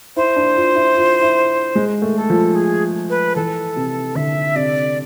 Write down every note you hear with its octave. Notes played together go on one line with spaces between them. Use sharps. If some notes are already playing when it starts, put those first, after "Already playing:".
E4 C5
D4
F4
E4
F4
E4
G#3
A3
A4
F3
G#4
B4
E3 A4
C3
D3 E5
C3 D5